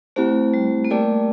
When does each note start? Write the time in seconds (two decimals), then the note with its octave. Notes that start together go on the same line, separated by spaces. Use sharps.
0.16 A3 C4 E4 G4 C5
0.54 G3
0.85 A#3
0.90 A3 G4 A#4 D5 G5